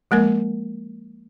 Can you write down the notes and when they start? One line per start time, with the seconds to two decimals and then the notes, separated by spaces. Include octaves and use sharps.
0.11 F3 G#3 A#3 A#4